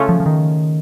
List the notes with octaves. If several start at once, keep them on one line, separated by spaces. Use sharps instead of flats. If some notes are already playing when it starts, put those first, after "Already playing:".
Already playing: C#3 A3 C#4 F4 A4
F3
F3
D#3